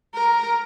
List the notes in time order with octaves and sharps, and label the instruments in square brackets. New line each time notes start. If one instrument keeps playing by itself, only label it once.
[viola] A#4